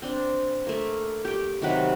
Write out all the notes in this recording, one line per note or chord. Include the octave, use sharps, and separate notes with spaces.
C4 D4
A3 A#3
G4 G5
C3 D#3 F#3 B4